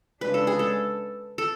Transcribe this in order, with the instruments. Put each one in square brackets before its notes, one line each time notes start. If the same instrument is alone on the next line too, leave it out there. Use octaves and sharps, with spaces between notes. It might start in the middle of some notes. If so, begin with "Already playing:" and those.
[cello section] C#3 G#3 D4 [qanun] B4
[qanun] A4
G#4
A4
A4